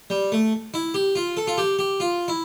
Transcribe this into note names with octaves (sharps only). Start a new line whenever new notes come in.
G3
A3
E4
G4
F4
A4
F4
G4
G4
F4
E4